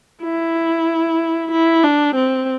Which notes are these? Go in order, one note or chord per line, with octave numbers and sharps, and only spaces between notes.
E4
E4
D4
C4